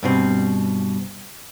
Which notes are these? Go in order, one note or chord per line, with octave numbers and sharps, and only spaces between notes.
G2 B2 C4